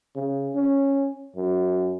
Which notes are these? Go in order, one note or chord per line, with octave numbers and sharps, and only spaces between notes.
C#3
C#4
F#2